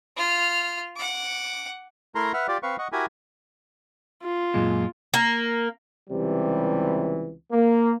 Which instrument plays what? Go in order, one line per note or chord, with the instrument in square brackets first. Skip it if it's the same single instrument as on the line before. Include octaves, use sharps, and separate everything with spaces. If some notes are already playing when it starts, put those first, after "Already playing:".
[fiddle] F4 F6
F#5 D6
[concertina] A3 E4 A#4 A#5 C6
B4 E5 F#5 F6
F4 G4 D5
C4 B4 F5 C#6
D#5 F#5 C#6
E4 F#4 G4 A#4 G#5 B5
[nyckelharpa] F4
[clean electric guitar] F#2 A#2 G#3
[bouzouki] A#3
[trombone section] C#2 C3 E3 G3
A#3